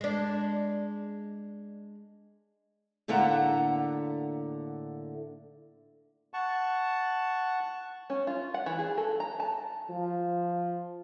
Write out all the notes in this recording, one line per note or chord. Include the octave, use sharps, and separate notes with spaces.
G#3 D4
A2 D3 A#3 E5 F#5 A#5
F#5 A5 C#6
C#4
F4
F#5
E3
G#4
A4
A#5
A5
F3